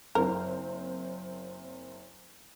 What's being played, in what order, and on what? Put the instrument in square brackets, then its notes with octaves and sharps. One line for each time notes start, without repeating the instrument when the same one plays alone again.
[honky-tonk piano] F#1 C4 [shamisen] A#4